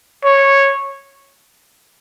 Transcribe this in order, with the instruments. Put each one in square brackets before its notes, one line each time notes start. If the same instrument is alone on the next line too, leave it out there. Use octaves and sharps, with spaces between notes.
[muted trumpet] C#5